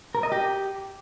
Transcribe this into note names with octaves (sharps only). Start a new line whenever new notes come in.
A#4
D#5
G4